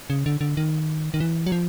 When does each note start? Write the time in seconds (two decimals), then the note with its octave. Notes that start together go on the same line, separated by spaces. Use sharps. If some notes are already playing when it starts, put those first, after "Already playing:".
0.10 C#3
0.26 D3
0.41 D3
0.57 D#3
1.14 D#3
1.20 E3
1.46 F#3
1.52 F3